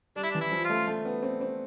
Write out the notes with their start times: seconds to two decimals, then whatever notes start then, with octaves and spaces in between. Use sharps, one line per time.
0.16 G3 D4
0.23 E4
0.31 D4
0.35 E3
0.41 E4
0.52 F3
0.64 F4
0.70 A3
0.87 A3
1.05 B3
1.23 C4
1.41 C4